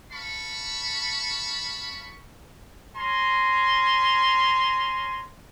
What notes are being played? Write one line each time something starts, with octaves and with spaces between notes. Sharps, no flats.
F5 A5 B5 C#6
C#4 G#5 A#5 C6